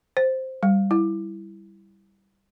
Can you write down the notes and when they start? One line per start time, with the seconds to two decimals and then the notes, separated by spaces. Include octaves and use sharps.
0.17 C5
0.63 G3
0.91 E4